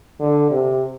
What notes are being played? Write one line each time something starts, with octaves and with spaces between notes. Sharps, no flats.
D3
C3